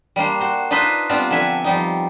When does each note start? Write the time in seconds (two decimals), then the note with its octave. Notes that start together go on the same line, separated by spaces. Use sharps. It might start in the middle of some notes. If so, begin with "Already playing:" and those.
0.16 G3 A#3 D4 C5
0.41 F#4 C5
0.71 D4 D#4 F4 B4 C5 D#5
1.09 G3 B3 C4 D4 F4 A#5
1.31 D3 F3 E5 G#5
1.64 F3 G3 D#4